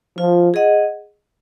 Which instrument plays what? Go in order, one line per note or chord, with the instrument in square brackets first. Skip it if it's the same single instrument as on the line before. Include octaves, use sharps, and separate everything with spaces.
[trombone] F3 [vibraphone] F4
[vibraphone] G#4 D#5 F#5